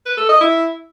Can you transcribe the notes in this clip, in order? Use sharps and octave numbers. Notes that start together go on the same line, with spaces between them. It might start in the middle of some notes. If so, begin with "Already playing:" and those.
B4
A4
D#5
E4